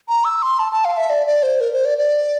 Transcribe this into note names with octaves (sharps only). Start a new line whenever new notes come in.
A#5
E6
C6
A5
A5
F5
E5
D5
D5
C5
A#4
C5
D5
D5